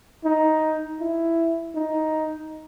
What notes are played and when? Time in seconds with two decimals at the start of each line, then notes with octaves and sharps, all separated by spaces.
0.24 D#4
1.00 E4
1.75 D#4